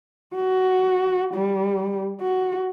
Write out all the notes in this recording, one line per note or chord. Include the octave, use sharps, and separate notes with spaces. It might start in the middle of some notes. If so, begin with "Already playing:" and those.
F#4
G3
F#4